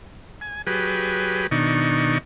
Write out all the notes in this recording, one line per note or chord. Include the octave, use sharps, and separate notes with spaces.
G#5
F#3 G4 G#4 B4
B2 D#3 D4 D#4 C#6